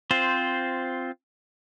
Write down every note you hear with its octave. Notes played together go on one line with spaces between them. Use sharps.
C4 F4 C5